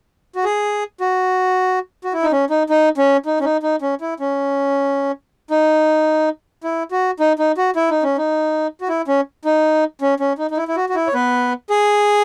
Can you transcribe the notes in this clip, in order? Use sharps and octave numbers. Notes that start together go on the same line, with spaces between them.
F#4
G#4
F#4
F#4
E4
D#4
C#4
D#4
D#4
C#4
D#4
C#4
D#4
D#4
C#4
E4
C#4
D#4
E4
F#4
D#4
D#4
F#4
E4
D#4
C#4
D#4
F#4
E4
C#4
D#4
C#4
C#4
D#4
D#4
E4
E4
F#4
F#4
E4
C#5
B3 B4
G#4